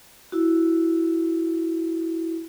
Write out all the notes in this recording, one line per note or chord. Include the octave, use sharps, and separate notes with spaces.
E4 F#4